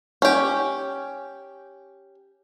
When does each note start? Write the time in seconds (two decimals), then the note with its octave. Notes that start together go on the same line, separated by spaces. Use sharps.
0.22 C#4 G4